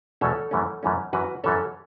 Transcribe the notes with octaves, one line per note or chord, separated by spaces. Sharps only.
E2 B2 F#3 A3 C#4 A4 C#5
F#2 E3 A3 C#4
F#2 E3 A3 C#4
F#2 E3 C#4 F#4 B4
F#2 E3 C#4 A4 C#5